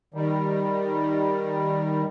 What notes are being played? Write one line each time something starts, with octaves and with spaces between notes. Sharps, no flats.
D#3 G3